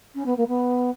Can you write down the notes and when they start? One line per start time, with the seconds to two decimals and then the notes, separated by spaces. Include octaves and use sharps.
0.15 C#4
0.25 B3
0.37 A#3
0.47 B3